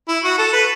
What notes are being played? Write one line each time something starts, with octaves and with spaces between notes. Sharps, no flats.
E4
F#4
A4
B4